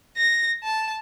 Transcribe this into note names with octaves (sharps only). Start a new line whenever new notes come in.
A#6
A5